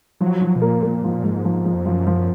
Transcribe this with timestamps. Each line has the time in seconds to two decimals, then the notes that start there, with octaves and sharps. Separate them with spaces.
0.20 F3 F#3
0.41 F3
0.56 B2
0.62 A#2 A#3
0.83 A#3
1.04 G#2 F3
1.13 A#2
1.23 G#2 F3
1.45 F3
1.65 F3
1.74 F2
1.86 F#2 F3
2.07 F3